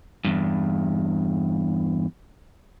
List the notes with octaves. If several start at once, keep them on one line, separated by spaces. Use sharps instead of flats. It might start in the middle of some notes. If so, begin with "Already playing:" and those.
E2 G2